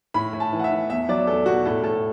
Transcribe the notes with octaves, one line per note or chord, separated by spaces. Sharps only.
A2 B5
A2
A5
E3
F#5
E5
E3
E2 E5
F#3 D5
E2 A4
B2 F#4
A2 A4
A2 A4